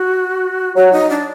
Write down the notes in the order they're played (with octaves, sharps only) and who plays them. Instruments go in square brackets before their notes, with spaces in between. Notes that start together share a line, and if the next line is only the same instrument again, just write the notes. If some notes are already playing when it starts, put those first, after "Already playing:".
Already playing: [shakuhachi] F#4
[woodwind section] F#3 [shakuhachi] F#4
[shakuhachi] D#4
D4